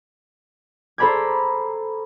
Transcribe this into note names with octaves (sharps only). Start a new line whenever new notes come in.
A4 C5 A#5 B5 D6 G#6